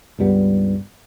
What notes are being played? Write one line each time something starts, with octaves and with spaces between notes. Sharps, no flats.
C#2 G2 G3 B3